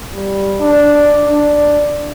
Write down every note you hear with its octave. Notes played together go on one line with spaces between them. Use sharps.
G3
D4
D4